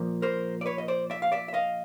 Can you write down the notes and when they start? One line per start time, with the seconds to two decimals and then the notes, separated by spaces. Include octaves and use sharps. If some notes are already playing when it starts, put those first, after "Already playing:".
Already playing: A#2 F3 A#3
0.22 A#4 C5
0.61 D5
0.66 B4 C#5
0.78 D#5
0.88 C5 D5
1.10 D5 E5
1.22 F5
1.32 D5 E5
1.48 E5
1.54 D#5 F5